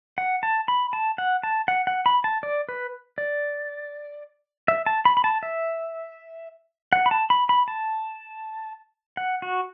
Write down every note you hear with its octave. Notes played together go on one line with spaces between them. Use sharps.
F#5
A5
B5
A5
F#5
A5
F#5
F#5
B5
A5
D5
B4
D5
E5
A5
B5
B5
A5
E5
F#5
B5
A5
B5
B5
A5
F#5
F#4